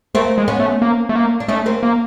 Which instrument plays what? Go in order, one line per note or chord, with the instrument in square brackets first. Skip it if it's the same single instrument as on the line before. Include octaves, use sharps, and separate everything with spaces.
[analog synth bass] A3 [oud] A#3 C4
[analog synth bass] G#3
[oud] B3 C#4
[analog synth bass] A3
A#3
A3
A#3
[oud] D4
[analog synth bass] A3 [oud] C#4 D#4
[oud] A#3 C4
[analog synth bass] A#3